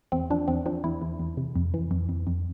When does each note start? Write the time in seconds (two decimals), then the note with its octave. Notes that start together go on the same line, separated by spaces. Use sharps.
0.12 E2 C4
0.30 F3 D4
0.48 E2 C4
0.66 F3 D4
0.84 E2 E4
1.02 E2
1.19 E2
1.37 C3
1.56 F2
1.74 E3
1.91 F2
2.09 F2
2.27 F2